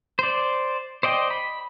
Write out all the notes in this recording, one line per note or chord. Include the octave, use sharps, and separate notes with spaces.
C5 D5
C5 D5 D#5 G5
B5